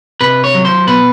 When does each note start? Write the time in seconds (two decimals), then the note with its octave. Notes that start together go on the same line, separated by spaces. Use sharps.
0.21 C3 B4
0.44 C#5
0.54 F#3
0.65 C5
0.87 B2 B4